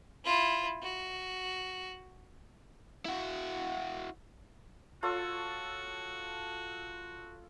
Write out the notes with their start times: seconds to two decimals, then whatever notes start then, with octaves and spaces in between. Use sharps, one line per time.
0.24 E4 F4
0.82 F#4
3.05 E4 F#4
5.03 F4 F#4 A4 C#5